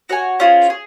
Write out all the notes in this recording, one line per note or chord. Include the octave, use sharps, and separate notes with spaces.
F#4 C#5 G#5
C#4 F4 G#4 C5
G#4